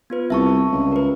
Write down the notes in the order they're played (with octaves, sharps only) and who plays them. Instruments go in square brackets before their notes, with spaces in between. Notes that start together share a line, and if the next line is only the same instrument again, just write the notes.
[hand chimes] B3 F4 B4
[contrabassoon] C2 [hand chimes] E5 A5 C#6
[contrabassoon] C#2
[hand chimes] A#4 B4